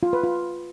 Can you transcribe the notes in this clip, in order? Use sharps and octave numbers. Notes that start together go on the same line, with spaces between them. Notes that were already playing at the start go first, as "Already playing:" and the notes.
F4
B4
F4